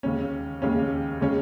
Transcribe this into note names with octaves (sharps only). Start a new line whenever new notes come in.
D#2 C#3 G#3 C#4
D#2 C#3 G#3 C#4
C#3 G#3 C#4